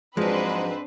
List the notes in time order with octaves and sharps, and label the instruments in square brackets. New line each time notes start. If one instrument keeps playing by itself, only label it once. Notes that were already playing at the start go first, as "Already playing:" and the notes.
[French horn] G#2 [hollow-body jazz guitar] F3 F#3 [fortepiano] G#3 G#4 [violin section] C4 D4 B4